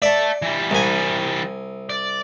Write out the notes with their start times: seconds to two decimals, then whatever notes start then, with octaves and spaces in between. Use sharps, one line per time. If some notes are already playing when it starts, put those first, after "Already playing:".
0.02 D5 E5 A5
0.42 E3 G3
0.71 C2 G#5
1.89 D5